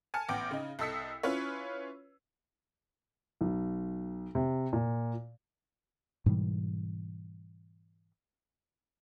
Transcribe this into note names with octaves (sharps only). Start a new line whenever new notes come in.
G#5 A5 F6 C#7
A1 B3 G5 D6
C#3 D#4
C2 A4 D#5 E6 B6 C#7
C#4 E4 F4 B4 C#5
B1
C3
A#2
G#2 B2 E3 G3